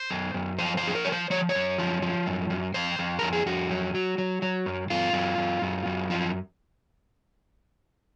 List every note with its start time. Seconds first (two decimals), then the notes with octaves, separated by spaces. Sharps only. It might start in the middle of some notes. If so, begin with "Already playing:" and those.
Already playing: C5
0.10 F#2
0.34 F#2
0.59 F3 C5
0.77 C5
0.83 F3 G#4
0.95 A#4
1.05 F3 C#5
1.12 C5
1.30 F3 C#5
1.49 C#5
1.55 F#2
1.78 F3
2.02 F3
2.27 F#2
2.50 F#2
2.74 F2 C5
2.99 F2
3.19 F2 A#4
3.33 G#4
3.46 F2 F#4
3.70 F#3
3.95 F#3
4.18 F#3
4.42 F#3
4.66 F#2
4.90 F#2 F4
5.13 F#2
5.38 F#2
5.62 F#2
5.86 F#2
6.10 F3